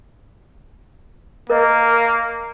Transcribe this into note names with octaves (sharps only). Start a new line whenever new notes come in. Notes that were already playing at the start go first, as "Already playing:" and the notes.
A#3 A#4 C#5 D#5